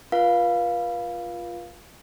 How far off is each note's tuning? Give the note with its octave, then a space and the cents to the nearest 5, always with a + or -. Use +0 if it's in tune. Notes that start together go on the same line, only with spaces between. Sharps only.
F4 +0 B4 -45 F5 +0